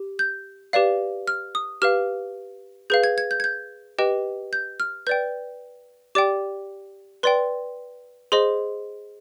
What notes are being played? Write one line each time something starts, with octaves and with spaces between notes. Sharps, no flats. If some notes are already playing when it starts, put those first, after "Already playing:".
Already playing: G4
G6
G4 B4 D5 F5
F6
D#6
G4 B4 F5 F6
G#4 B4 F5 G6
G#6
G#6
G6
G#6
G6
G4 B4 D#5 G5
G6
F6
B4 D5 G5 G6
G4 D5 G5 D6
B4 D5 G5 C6
G#4 C5 D#5 C6